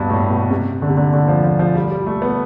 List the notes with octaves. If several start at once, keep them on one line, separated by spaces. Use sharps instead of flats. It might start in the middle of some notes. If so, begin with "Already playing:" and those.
Already playing: G2 B2
A2
B2
C3
D3
C3
D3
D3
F3
F3
F3
G3
G3
A3
B3